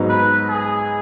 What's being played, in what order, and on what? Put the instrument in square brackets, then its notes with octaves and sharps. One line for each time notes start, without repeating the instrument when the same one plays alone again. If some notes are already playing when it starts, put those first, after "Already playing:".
Already playing: [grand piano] G#2 F#3 B3 D#4 F#4
[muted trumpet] B4
G#4